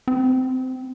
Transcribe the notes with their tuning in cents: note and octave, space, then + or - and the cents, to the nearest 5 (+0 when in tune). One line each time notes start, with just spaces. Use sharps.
C4 -20